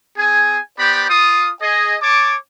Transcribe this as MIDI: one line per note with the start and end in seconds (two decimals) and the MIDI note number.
0.18 0.58 60
0.18 0.58 68
0.18 0.58 80
0.78 1.08 59
0.78 1.08 67
0.78 1.08 72
0.78 1.08 74
0.78 1.08 83
1.10 1.50 65
1.10 1.50 87
1.62 1.97 68
1.62 1.97 75
2.02 2.36 73
2.02 2.36 81
2.02 2.36 86